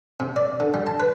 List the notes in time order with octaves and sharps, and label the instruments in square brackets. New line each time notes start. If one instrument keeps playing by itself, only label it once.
[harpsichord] C3
D5
D3
G3
A5
B4